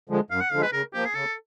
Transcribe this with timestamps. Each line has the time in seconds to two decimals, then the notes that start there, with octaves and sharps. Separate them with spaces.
0.09 D3 F3 G#3
0.30 F#2 F5
0.41 F#5
0.51 D3 F3 G#3 F5
0.62 B4
0.72 C#3 A#4
0.94 F3 A#3 G4
1.05 G#4
1.14 C#3 A4